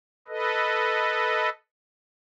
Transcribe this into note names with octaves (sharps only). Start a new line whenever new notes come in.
A4 B4 D#5